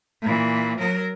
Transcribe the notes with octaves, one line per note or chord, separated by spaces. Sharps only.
A#2 E3
F#3 A#4